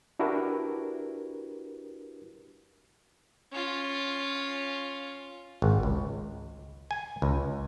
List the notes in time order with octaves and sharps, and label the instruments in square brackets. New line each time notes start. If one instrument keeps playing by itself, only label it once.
[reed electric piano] D4 E4 F#4 G4 A#4 B4
[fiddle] C#4 F4
[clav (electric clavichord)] G#1
C#2
G#5
C#2